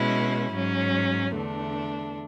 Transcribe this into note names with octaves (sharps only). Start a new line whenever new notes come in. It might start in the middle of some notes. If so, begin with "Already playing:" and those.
Already playing: B2 G#3 C#4 E4
G#2 F#3 C#4
E2 D3 A3 D4